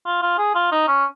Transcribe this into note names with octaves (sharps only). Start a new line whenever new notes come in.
F4
F4
G#4
F4
D#4
C#4